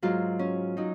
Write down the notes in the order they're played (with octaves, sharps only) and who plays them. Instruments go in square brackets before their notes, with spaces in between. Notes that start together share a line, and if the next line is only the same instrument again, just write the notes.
[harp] G#2 F#3 F4
C#4
F#3 D#4